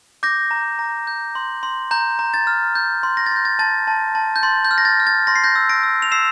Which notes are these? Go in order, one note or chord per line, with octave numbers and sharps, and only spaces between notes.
D6 G6 A#6
A#5
A#5
G6
C6
C6
A#5 G6
A#5
A6
F6
G6
C6
A#6
A6
C6 G6
A6
A5 A6
A5
A5
G6
C6 A6
G6
F6
A#6
A6
F6
A6
C6 A#6
C7
G6 A#6
E6
A#6 D7
E6
F7
E6 C7 E7